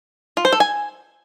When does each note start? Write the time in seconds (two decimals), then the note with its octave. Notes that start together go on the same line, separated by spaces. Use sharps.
0.37 F4
0.45 C5
0.52 A4
0.60 G#5